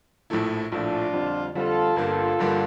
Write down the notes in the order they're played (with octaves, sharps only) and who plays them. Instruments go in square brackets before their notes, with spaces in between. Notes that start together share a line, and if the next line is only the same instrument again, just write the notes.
[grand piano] A#1 A2 F3 A3 E4
[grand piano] A#1 A2 F3 A3 E4 [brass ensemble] D4 F4
[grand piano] F2 D3 G3 C4
[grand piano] F2 D3 G3 C4 [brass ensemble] F4 A4
[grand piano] G1 G2 D3 G3 A#3 [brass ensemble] F4 A4
[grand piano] G1 G2 D3 G3 A#3